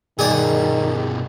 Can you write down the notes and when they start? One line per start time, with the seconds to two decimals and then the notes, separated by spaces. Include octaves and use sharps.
0.19 G2 B2 D#3 G#4 D5